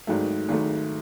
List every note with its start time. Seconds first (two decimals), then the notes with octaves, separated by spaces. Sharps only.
0.07 G#1 G#2 D#3 F#3 A3
0.49 G#1 G#2 D#3 F#3 A3